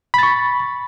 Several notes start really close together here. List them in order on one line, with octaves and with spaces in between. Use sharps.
B5 A6 C#6